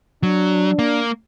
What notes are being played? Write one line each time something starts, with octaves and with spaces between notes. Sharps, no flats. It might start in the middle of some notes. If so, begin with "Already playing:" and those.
F#3 D4
A#3